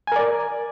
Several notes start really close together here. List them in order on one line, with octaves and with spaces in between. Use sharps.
G#5 A#4 D5